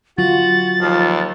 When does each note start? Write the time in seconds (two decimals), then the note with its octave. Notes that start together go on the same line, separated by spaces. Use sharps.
0.18 D3 F#3 F4 F#4 A6
0.81 D#2 F3